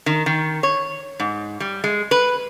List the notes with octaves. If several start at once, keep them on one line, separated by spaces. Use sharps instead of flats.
D#3
D#3
C#5
G#2
G3
G#3
B4